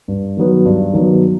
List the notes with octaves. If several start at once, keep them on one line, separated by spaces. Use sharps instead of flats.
G2
D#3 F#3 B3
G2
D#3 F#3 B3